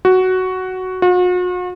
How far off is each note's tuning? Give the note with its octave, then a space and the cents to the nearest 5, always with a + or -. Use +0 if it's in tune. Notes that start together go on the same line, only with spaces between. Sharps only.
F#4 +5
F#4 -45